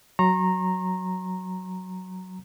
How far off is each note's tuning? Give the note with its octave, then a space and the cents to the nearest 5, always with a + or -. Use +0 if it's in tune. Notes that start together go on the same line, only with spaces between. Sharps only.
F#3 +0 A#5 -5 C#6 -45